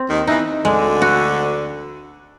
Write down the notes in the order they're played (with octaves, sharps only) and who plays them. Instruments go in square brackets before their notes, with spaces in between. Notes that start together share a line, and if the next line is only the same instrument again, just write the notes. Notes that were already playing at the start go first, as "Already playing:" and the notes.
Already playing: [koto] C4
[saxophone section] D#2 D#3
[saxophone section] E2 E3 [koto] D#4
[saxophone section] D2 D3 [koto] G#3
[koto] F#4